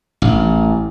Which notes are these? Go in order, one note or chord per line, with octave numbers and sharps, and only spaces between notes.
A1